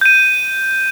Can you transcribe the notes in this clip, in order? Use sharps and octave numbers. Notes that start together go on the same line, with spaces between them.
G6 D#7